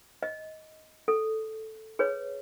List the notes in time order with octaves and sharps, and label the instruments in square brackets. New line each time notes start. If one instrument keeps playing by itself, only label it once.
[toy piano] D#5
A4
G#4 B4 C#5